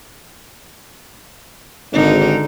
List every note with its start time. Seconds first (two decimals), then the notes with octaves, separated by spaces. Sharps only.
1.93 G#1 D3 D#4